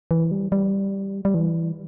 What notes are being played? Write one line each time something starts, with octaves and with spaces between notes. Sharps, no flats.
E3
G3
G3
G3
E3